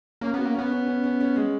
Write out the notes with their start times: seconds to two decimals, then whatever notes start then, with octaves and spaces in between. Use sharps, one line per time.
0.21 A#3 C#4
0.34 B3
0.38 F#4
0.45 A#3
0.54 B3 C#4
0.71 C#4
0.86 C#4
1.04 C#4
1.20 C#4
1.36 G#3